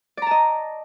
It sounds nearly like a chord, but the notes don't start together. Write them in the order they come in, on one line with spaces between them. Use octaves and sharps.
D5 A#5 A5 D#5